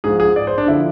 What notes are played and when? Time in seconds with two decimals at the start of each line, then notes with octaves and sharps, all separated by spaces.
0.04 G#2 F3 G#4
0.20 G#4
0.36 D5
0.47 C5
0.58 D4
0.68 D3 F3 E4